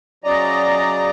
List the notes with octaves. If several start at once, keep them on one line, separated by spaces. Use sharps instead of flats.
C#3 F#3 D5 D#5 A#5